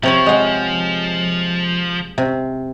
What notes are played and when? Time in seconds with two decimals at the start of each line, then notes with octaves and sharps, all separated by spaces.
0.03 C3 F3 C#5 B5
0.26 G#3 F#5
2.18 C3